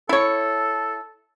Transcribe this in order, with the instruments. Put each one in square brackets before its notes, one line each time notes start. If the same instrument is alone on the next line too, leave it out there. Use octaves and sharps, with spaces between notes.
[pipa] E4 C#5 [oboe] A4